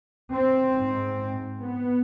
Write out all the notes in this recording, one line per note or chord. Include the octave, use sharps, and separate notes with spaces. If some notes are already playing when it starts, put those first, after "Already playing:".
C4
G#2
B3